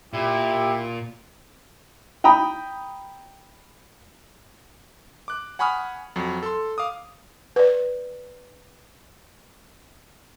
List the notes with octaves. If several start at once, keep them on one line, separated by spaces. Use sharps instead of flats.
A#2 E4 G4
G5 A#5 B5 D#6
D6 F#6
F#5 G#5 B5 C#6 D#6 F6
F2 F#3
A4 C6
F5 D6 D#6
B4 D5